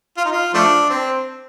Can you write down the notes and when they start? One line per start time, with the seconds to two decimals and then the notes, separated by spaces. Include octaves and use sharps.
0.17 F4
0.25 D#4
0.32 F4
0.54 F3 A3 D4
0.90 C4